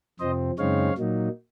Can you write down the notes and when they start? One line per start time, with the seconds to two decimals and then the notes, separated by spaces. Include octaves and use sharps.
0.20 F2 C3 F3 C4 C5 D#5
0.59 F#2 C#3 G#3 C4 D#4 C#5 F5
0.98 A#2 F#3 A#3 D#4